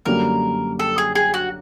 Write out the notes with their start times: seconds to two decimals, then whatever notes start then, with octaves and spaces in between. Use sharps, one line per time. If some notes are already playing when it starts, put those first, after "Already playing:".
0.05 F#2 D3 G3 A#3 A#4
0.79 A4
0.98 G#4
1.15 G#4
1.34 F#4